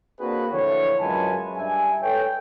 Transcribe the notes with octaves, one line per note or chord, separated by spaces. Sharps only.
A#3 C4 D4 F#4 G#4 B4
D3 E3 F3 E4 C#5
F#2 G#3 F4 B4 G#5 A5
G2 D4 E5 G#5
A4 B4 C#5 G5